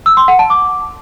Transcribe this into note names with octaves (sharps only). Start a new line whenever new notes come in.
E6
C6
F#5
A5
D6